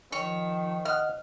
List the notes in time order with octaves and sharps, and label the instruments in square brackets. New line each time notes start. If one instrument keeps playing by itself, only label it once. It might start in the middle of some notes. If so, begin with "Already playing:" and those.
[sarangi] D#3 [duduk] F3 [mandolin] C#5
[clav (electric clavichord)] D#5 F#5 [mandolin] F6